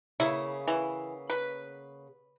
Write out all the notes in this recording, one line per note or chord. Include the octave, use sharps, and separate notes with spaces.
C#3 A#3 B3 E4
E3
B4